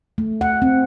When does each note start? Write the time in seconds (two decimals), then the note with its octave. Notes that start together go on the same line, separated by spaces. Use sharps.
0.18 A3
0.41 F#5
0.62 C4